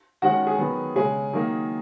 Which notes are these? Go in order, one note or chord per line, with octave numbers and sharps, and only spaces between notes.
D#3 G#3 C#4 F#4 F#5
G#4
D#3 F#3 B3
C#3 G#3 C#4 G#4
D#3 F#3 A#3 D#4